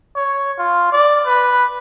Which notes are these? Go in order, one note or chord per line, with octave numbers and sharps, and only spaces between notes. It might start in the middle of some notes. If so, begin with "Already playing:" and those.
C#5
F4
D5
B4